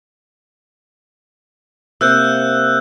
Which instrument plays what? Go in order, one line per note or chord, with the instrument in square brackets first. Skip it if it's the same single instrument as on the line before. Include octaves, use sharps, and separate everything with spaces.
[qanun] C3 A#3 [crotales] E6 F#6 G6